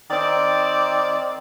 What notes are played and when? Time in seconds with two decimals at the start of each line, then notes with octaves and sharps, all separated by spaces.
0.11 D#3 C4 D5